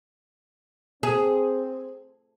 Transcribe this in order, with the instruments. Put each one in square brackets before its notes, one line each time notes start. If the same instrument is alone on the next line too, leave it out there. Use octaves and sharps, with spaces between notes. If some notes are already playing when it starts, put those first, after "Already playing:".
[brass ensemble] C4 C5 [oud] G#4